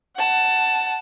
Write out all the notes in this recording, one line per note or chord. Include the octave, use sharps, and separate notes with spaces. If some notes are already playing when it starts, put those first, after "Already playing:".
F#5 A5